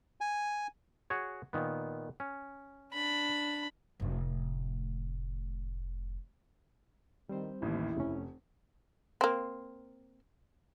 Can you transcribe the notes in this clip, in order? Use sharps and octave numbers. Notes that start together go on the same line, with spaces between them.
G#5
F#4 G#4 C#5
A#2 D#3 B3
C#4
D4 B5
F1 A2
G2 D#3 G3 C4 C5
A1 D#2 E4
F1 A3 C#4
A#3 C4